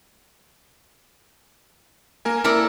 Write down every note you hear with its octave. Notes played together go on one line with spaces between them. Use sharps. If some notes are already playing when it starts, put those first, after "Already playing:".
A#3 A#4 G#5
E4 A4 A#4 D5